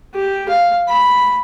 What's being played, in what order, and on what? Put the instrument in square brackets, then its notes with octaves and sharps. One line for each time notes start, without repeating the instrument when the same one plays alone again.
[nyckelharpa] G4
F5
B5